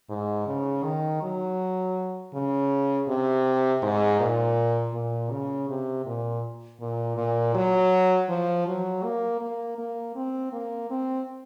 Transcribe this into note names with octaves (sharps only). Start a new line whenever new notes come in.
G#2
C#3
D#3
F#3
C#3
C3
G#2
A#2
A#2
C#3
C3
A#2
A#2
A#2
F#3
F3
F#3
A#3
A#3
A#3
C4
A#3
C4